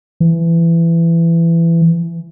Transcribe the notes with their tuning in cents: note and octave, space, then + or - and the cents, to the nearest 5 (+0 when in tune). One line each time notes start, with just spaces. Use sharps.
E3 +20